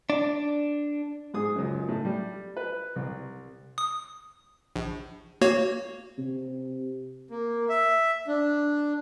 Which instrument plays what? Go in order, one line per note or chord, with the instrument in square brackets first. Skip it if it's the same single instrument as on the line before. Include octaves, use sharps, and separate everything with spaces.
[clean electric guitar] D4
[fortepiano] G#2 G#4 D#6
C#2 F#2
A2
G3
B4
C2
[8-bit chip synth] D#6
A#1
A#3 F#4 C#5
[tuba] C3
[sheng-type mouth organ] A#3
E5
D4